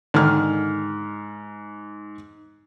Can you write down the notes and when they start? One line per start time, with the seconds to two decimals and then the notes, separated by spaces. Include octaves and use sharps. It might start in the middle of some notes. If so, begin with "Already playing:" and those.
0.14 G#2 D3 D#3 F6